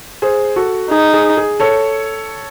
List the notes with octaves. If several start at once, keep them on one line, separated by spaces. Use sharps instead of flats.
G#4 C5
F#4 A4
D#4 G#4
G#4
G#4
A4 C#5